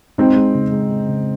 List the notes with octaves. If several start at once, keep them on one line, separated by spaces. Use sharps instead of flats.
G#3 C4 D#4
G#3
C#3
G#3
G#3
C#3